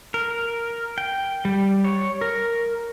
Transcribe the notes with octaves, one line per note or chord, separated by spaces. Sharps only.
A#4
G5
G3
C#5
A#4